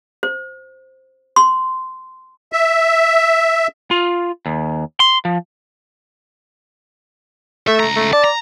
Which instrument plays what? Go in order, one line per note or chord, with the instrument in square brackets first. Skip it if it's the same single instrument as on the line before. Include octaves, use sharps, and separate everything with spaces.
[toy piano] C5
C6
[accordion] E5
[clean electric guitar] F4
D#2
C6
F3
[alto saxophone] A3 [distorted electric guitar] E5
[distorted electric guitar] C#2 A#5
[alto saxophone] A3
[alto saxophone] D5 [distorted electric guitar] A5
[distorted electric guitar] A#5